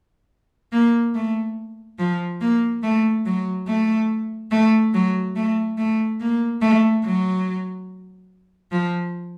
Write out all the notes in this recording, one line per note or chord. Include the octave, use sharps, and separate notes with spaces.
A#3
A3
F3
A#3
A3
F#3
A3
A3
F#3
A3
A3
A#3
A3
F#3
F3